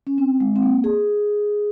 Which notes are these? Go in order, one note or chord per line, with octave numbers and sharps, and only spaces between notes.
C#4
C4
G#3
C4
A#3
G#4